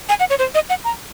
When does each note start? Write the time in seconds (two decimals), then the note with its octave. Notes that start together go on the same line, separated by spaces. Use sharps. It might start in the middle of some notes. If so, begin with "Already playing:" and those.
0.09 G#5
0.20 F#5
0.30 C#5
0.39 C5
0.55 D#5
0.70 F#5
0.84 A#5